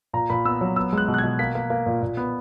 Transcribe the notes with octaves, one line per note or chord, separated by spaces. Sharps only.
A#2 A#5
A#2 B5
B3 E6
F#3
B3 E6
G#3 F#6
B2
F#6
G#6
B2
A#3 B6
A#3
A#3
A#2
A#2
B3